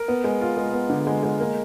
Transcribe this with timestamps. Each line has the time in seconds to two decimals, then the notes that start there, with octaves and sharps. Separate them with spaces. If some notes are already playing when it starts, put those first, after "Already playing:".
Already playing: A#4
0.08 B3
0.24 G#3
0.41 F4
0.57 G#3
0.73 B3
0.90 D3
1.07 G#3
1.23 G#3
1.40 A#3